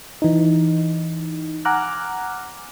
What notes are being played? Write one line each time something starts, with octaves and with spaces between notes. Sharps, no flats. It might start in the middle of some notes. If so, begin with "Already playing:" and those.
E3 D#4
F#5 G#5 A#5 D6 F6 F#6